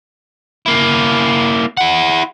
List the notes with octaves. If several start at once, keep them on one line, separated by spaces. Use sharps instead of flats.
A#3 E4
E4 F#5